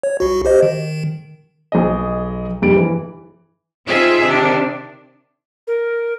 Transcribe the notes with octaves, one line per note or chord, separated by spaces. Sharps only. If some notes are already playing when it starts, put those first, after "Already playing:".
C#5
C2 F#4
G4 C5 D#5
D#3
B1 G#4 D#5
F1 G2 G3 D7
E3
C4 D#4 F4 G#4 E5
C3 D#3 D4
A#4